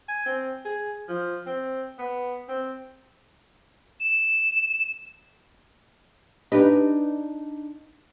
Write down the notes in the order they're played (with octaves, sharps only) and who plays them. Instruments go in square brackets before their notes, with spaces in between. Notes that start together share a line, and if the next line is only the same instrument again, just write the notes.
[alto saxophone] G#5
C4
G#4
F3
C4
B3
C4
[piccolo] E7
[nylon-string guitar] D4 D#4 [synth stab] G4 B4 D#5